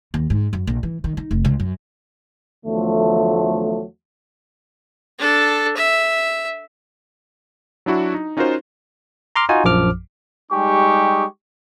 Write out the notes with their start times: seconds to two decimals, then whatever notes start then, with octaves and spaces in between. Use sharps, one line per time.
0.14 D#2
0.30 G#2
0.53 F#2
0.67 A#1
0.83 E3
1.04 D#3
1.17 D#4
1.31 F1
1.45 C#2
1.60 F#2
2.65 E2 D3 F3 F#3 A3
5.19 D4 A4
5.77 E5
7.86 F#3 D4 E4 F#4
8.14 D#4
8.37 C#4 D#4 F4 F#4 A#4 C5
9.36 A#5 C6 D6 F6
9.49 D#4 F4 F#4 G#5
9.64 A#1 F#2 F3 D6 F6
10.52 G3 G#3 D#4 G4 G#5 C#6